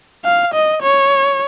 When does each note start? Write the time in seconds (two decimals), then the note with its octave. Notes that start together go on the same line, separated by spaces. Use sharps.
0.25 F5
0.54 D#5
0.82 C#5